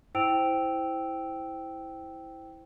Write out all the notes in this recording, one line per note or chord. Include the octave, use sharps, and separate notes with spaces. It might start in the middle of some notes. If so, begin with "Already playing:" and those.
E4 C5 G5 E6 D7 F7